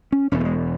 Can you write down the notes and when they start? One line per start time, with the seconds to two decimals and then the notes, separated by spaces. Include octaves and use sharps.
0.12 C#4
0.32 E1 E2 B2 C#4
0.40 A3
0.45 G#3